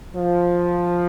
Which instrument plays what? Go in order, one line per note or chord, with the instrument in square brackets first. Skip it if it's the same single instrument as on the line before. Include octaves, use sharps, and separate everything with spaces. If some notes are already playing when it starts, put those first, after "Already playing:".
[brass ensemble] F3